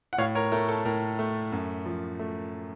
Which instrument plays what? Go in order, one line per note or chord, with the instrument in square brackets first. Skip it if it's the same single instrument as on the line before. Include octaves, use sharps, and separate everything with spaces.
[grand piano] F#5
A2 C#5 F5
A#4 C#5
A3 A#4
A4
A2 A#4
A3
F#2
F3
A3